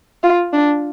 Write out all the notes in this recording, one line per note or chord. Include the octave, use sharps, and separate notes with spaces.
F4
D4